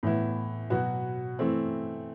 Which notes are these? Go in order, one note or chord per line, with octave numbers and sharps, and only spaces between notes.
A2 E3 B3 E4
B2 F#3 B3 F#4
E3 A3 C4